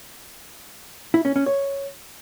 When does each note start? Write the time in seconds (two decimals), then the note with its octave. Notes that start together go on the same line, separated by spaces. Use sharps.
1.14 E4
1.25 C#4
1.36 C#4
1.46 C#5